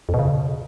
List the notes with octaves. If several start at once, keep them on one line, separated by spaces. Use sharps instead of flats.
F2
B2
C#3